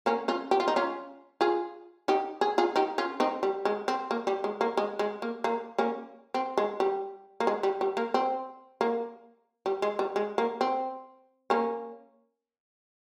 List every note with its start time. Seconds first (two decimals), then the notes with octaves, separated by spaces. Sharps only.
0.06 A#3 C#4
0.28 C#4 F4
0.51 G4
0.60 F4
0.68 D#4
0.76 C#4 F4
1.41 F4 G#4
2.08 D#4 G4
2.41 G#4
2.58 F4 G#4
2.76 D#4 G4
2.98 C#4 F4
3.20 C4 D#4
3.43 G3
3.65 G#3
3.88 C4
4.11 A#3
4.27 G3
4.44 G#3
4.61 A#3
4.77 G#3
4.99 G#3
5.22 A#3
5.44 A#3
5.78 A#3 C#4
6.34 C4
6.57 G#3
6.80 G3
7.40 A#3
7.47 G#3
7.63 G3
7.81 G3
7.97 A#3
8.14 C4
8.81 A#3
9.66 G3
9.82 G#3
9.99 G3
10.16 G#3
10.38 A#3
10.61 C4
11.50 A#3 C#4